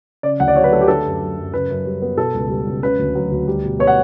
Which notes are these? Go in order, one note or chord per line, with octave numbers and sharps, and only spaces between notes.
C#3 D5
D2 F#5
D5
F#3 C#5
B4
A3 A4
G4
D3 A4
F#2
F#3
F#2
C#3 B4
F#2
G3
B3
B2 A4
C#2
G3
C#2
C#3 B4
D2
F#3
D2
G3
B2
B3 C#5
F#5